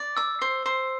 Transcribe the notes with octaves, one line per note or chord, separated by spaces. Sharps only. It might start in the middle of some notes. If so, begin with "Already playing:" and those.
Already playing: D5
D6 E6
C5
C5